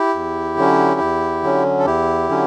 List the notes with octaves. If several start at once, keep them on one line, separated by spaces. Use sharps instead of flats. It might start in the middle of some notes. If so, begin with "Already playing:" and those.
Already playing: E4 G4
E2
D3 F#3 C#4
E2
D3 F#3 C#4
A4
E2 E4 G4
D3 F#3 C#4